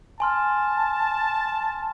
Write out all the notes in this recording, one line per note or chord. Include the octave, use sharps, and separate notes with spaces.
G#5 A5 C6 F6